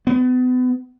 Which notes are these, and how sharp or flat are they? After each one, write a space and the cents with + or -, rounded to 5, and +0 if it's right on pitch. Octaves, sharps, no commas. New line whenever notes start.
B3 +35